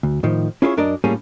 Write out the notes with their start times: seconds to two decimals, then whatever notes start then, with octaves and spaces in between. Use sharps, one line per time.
0.03 D2
0.23 A2 D#3 F3
0.62 C#4 E4 F4 G#4 B4 C#5
0.77 F#2 D4 A#4 D5 D#5
1.04 A2 G3 A#3 C#4 G#4